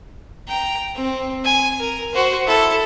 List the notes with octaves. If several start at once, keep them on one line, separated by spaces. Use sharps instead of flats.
G5 A#5
C4
G#5
A#4
F#4 C5
E4 A4